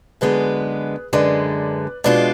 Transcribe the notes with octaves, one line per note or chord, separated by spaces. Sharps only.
F#2 D3 G#3 B3 G#4 B4
F#2 D3 G#3 B4 D5
B2 G#3 D4 F4 B4 D5